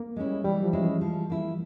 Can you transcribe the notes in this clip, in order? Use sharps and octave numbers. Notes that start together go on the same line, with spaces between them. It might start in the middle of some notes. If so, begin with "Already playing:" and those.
Already playing: A#3
G#3 C#4 E4
G3
E3 G3
F3
G#3 C#4 E4
E3
F3
A#3 E4